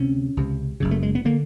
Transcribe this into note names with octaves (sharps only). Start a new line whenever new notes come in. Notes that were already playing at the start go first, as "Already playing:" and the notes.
Already playing: D2 C3 C#4
C#2 C3
F#1 F#2 C#3
A3
G#3
B3
D3 A#3